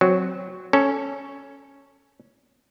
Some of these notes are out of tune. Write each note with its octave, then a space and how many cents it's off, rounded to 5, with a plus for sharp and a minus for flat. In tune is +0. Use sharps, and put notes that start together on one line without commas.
F#3 -5 C4 +0
C#4 +0 A4 +0